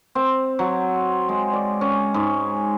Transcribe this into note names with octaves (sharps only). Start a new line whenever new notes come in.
C4
F#3
G#3
D5
C#4
G#2